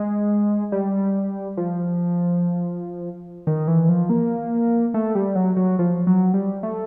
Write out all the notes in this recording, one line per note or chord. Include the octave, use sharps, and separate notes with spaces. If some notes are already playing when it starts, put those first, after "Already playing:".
Already playing: G#3
G3
F3
D#3
E3
F3
A#3
A3
G3
F#3
F#3
F3
F#3
G3
A3